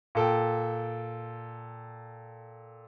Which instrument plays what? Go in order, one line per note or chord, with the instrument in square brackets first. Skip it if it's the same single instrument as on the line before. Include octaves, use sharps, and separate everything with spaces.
[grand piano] A#2 A4 G5